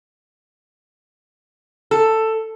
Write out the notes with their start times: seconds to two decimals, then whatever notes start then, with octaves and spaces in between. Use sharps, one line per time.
1.91 A4